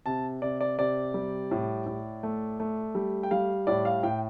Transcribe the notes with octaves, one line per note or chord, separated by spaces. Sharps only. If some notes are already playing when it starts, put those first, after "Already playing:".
C3 A5
C3 D5
D5
C3 D5
G3
A2
A2
A3
A3
G3
G5
G3 F5
A2 D5
F5
A2 G5